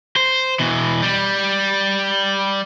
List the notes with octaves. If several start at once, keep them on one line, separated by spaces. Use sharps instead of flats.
C5
B2 E3
G3